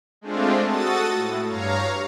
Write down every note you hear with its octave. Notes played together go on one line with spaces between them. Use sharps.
G#3 A3 C4 D4 F4
F#4 A4 D#6 A6
A2
G2 C#5 F5 A#5